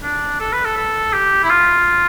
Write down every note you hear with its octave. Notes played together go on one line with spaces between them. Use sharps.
D4
A4
B4
A4
A4
G4
E4
F4